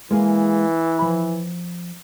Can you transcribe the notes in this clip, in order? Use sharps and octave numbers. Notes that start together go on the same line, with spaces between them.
E3 G#3 A#3 G#4
F3 B5